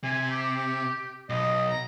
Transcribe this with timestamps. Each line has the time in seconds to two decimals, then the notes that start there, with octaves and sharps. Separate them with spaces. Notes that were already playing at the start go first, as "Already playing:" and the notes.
0.04 C3 G#5
0.29 G4
1.30 B1 D#5
1.69 A#5